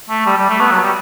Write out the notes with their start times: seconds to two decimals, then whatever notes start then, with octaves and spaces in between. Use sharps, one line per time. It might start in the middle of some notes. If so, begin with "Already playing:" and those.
0.10 A3
0.26 G3
0.37 G3
0.49 A3
0.60 B3
0.71 F#3
0.83 G3